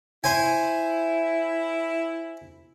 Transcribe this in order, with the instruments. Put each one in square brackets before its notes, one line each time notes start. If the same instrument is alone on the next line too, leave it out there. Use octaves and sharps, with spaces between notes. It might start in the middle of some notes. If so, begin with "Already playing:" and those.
[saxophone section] E4 [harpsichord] C5 G#5